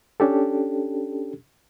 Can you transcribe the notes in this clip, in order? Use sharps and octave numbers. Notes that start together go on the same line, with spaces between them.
C#4 D4 G4 A4